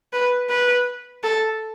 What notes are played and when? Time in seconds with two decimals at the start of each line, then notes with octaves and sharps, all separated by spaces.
0.13 B4
0.49 B4
1.23 A4